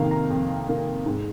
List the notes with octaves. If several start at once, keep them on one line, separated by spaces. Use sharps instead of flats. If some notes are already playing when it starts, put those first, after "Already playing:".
Already playing: F2 C3 D#3 A#3 F5
A#5
F2
C3 D#3 A#3
G#2